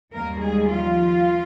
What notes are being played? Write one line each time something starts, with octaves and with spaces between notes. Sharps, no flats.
D#2 D#3 G3 A#3 A#4
G#3 G#4
F3 F4